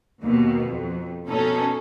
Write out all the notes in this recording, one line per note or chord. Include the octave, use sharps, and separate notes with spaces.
D#2 B2
F2
B2 C#4 D#4 A4